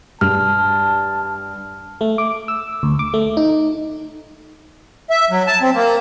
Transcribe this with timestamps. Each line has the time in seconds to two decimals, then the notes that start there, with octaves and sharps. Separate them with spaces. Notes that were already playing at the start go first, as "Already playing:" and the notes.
0.21 G2 A5 F6
2.01 A3
2.18 D6
2.48 E6
2.83 D2
2.99 D6
3.14 A3
3.37 D#4
5.10 E5
5.30 F#3
5.47 A5
5.62 C4
5.74 A#3